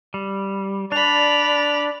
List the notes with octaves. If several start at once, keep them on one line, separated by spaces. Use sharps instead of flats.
G3
D4 D5 B5 F7